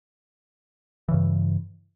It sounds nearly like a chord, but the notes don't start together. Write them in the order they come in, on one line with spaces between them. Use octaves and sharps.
E3 C#3 G2